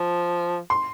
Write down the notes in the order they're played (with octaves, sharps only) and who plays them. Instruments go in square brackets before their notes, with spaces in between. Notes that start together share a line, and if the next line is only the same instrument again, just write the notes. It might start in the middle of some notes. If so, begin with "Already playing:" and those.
Already playing: [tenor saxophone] F3
[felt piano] C6